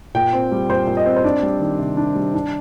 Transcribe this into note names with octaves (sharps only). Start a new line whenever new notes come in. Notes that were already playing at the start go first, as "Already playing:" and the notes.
A#2 G5
C4
G3
A#2 C5
A#2
D#5
C4
C5
D4 D5
G3
D#3
C3
D4
G3
D4